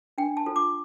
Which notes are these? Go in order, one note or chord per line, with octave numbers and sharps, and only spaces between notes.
D4 G5
A5
F4 A4 C5
D6